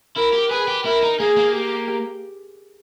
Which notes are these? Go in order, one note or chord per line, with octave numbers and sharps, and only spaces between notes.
E4 A#4
G4
G#4 B4
G4
E4 A#4
D#4
A#3 G#4
A#3
G4